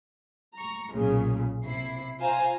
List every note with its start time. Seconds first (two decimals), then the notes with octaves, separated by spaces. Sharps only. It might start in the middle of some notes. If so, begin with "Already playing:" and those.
0.56 A#5 C#6
0.93 B1 A#2 C#3
1.64 C3 E4 C7
2.19 F4 C5 F5 G#5 A#5